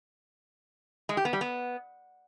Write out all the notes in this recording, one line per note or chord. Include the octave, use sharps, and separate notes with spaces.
G#3
G4
B3
G3
B3